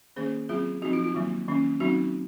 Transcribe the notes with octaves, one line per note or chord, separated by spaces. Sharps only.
D#3 A#3 C#4 G#4 C5
F#3 C4 F4 G#4
F3 C4 D#4 F#4
F4
F4
D#3 F#3 A#3
D#3 A#3 C#4
F#3 C4 D#4 F#4